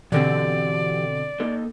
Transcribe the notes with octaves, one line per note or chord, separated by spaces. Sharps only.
B2 D3 E3 C4 G4 D5
A#3 D#4 A4